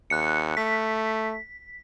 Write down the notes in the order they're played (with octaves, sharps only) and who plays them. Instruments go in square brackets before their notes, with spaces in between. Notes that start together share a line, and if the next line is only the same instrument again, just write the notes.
[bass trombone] D#2 [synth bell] F#6 C#7
[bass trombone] A3 [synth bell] B6